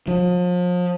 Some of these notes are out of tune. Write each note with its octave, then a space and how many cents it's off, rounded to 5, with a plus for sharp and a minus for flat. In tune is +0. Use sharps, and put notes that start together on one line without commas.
F3 +35